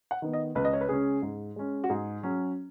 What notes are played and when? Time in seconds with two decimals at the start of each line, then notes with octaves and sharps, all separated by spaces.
0.11 F#5
0.22 D#3 B3
0.33 D#5
0.55 C#2 B4
0.65 D#5
0.73 C#5
0.81 B4
0.89 C#3 G#3 C#4 G#4
1.22 G#2
1.56 G#3 C#4
1.84 F#4
1.90 G#2 G#4
2.23 F#3 C#4